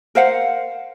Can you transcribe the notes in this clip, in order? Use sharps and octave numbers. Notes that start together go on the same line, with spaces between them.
A#4 C5 F5 F#5